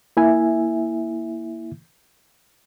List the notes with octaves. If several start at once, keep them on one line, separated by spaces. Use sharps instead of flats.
A#3 E4 E5 G#5